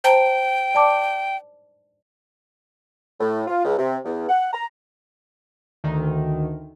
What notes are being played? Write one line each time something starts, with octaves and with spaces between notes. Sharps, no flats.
C5 G5 A5 A#5
D5 A5 D6
A2
F4
C#2
C3
E2
F#5
A#5
D2 D#3